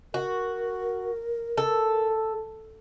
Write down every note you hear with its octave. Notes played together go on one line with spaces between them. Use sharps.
F#4 A#4
A4